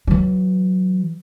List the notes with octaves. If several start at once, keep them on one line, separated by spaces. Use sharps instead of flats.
E3 F#3